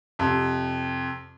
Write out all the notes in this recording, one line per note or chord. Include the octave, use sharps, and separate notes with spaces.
F2 C3